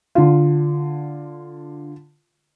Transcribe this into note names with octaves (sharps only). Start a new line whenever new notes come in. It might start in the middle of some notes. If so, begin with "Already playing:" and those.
D3 F4